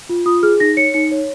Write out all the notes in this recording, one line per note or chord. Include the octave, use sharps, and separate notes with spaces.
F4
F4 D#6
G#4 F6
D#4 A#6
C#5 C#7
D#4 C#7
C#5